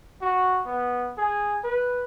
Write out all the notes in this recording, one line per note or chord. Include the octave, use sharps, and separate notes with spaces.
F#4
B3
G#4
B4